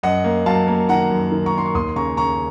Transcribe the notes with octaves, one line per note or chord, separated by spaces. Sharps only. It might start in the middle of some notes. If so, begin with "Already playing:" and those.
F#2 D#5 F#5
A#3
F#3 F5 A5
A#3
D#3 F#5 A#5
F#2
D#3
A#5 C#6
D#3 C6
C#6
D#2 C6 D#6
C#3 A#5 C#6
C#3 A#5 C#6